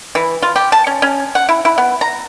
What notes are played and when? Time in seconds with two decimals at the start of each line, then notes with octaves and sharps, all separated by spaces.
0.15 E3
0.43 F4
0.56 G4
0.72 A5
0.87 C#4
1.02 C#4
1.35 F#5
1.49 E4
1.65 E4
1.78 B3
2.01 A#5